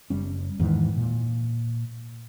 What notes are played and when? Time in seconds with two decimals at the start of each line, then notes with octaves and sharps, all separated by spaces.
0.10 F#1 G3 C#4
0.59 E2 G#2 D#3 E3
0.97 A#2